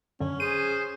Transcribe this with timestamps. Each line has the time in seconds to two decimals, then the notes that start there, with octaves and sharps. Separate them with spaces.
0.20 F#2 D3 C#4
0.40 G#4 C5 D#7